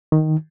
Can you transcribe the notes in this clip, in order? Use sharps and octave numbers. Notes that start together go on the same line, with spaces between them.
D#3